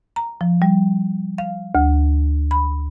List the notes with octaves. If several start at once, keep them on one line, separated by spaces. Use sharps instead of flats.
A#5
F3
G3
F5
D2
B5